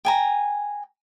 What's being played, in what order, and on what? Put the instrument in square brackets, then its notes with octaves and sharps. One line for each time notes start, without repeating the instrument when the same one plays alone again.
[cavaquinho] G5 G#5 A#5